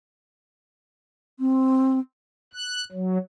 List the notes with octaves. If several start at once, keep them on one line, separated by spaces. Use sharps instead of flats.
C4
F#6
F#3